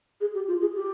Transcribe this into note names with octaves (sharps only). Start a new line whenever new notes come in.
G#4
G4
F4
G#4
G4